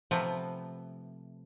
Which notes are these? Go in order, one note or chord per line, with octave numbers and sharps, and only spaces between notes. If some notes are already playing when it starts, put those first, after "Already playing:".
C3 F3 A3 B3